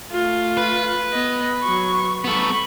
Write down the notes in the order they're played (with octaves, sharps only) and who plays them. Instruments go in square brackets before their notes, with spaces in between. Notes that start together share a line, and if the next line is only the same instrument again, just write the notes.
[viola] A3 F4
[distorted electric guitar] B4
[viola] B3 D#5
F#3 C#6
[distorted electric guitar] B3 A4 [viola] B5 C#6